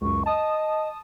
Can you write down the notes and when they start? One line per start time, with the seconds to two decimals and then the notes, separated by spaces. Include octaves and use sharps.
0.01 C#2 F#2 C#6
0.26 D#5 A5 D#6